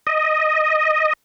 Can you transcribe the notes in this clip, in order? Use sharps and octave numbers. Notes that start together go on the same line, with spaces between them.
D#5